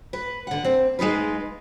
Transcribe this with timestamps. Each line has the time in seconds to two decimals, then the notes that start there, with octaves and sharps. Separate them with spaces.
0.13 B4
0.47 D3 F#5
0.64 C4
0.99 G#3 D#4 F4 B4